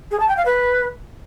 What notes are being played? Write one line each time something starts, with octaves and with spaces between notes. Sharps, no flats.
G#4
A5
G5
F5
B4